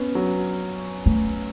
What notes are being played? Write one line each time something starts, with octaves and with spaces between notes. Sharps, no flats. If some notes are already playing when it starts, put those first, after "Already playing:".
Already playing: B3 C#4
F#3
A3